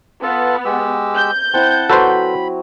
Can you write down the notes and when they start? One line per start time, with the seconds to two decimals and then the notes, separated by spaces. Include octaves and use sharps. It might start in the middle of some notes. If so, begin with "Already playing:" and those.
0.23 B3 F4 A4 A5
0.65 G#3 G4 E6
1.15 G6
1.54 C4 E4 F#5 A5
1.90 F#3 A4 B4 C5 B5